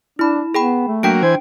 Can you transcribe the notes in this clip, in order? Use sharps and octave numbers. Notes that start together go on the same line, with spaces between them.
D4 E4 B5
B3 G#4 G5 B5
A3
F#3 A#3 D4 G5 D7
E3 C5 G#5